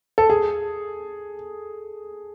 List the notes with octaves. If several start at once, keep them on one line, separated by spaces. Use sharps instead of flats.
A4
G#4